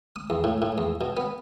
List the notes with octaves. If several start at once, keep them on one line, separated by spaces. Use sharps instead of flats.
D#6
E2
A2
A2
E2
B2
B3